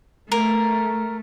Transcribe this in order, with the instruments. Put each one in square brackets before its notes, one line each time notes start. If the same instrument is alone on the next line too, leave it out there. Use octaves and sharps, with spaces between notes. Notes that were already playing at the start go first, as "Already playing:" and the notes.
[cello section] A3 [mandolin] A#4